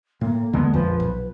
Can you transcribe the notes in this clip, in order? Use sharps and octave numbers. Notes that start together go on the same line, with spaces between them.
A2 A#3
E2 D3 G#3 B3
A#1 F2 F3 B4
B1